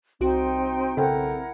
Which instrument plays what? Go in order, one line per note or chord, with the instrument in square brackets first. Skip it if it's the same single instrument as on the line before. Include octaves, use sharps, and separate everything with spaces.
[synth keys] C2 F#4 D7 [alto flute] C4 [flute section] D#4 G5 C6
[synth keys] B1 C#3 [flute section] E4 A#4 F#5 [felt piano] A4 G5